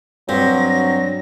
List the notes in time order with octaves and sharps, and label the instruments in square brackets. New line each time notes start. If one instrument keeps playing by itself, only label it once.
[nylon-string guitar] G2 [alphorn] F#3 [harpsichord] C4 [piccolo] A#6